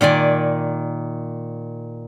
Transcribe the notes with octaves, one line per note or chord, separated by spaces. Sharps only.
A#2 D#3 D5 G#5